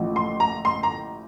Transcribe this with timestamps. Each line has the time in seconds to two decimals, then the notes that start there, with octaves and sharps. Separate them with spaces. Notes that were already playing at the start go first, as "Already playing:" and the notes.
Already playing: A1 A2 F3
0.16 C6
0.40 A#5
0.65 C6
0.83 A#5